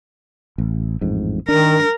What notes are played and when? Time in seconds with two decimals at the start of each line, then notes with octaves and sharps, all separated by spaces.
0.58 A1
1.01 A1 F2 G#2
1.48 D#3 D4 A#4